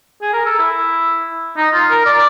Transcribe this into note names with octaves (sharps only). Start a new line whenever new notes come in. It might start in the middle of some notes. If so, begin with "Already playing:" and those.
G#4
A#4
A4
E4
D#4
F4
A#4
D5